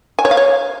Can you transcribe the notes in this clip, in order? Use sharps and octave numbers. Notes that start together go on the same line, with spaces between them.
G#5
C#5
F5
C#5